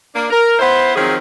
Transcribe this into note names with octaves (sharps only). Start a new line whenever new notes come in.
A#3 D4
A#4
B3 E4 C5
D#3 F3 F#3 C4 G#4